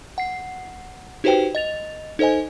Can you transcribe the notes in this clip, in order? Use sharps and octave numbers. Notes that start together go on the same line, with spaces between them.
F#5 C7
D#4 F#4 G4 B4 C5 G5
D#5 A6 F7
D#4 A4 C5 D#5 G#5